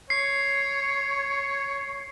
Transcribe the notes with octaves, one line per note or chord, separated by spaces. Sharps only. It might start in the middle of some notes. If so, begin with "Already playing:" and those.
C#5 C7